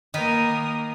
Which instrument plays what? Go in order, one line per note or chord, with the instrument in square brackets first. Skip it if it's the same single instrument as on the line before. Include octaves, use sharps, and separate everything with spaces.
[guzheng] D#3 D#4 B4 [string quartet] A#3 A#4 D#6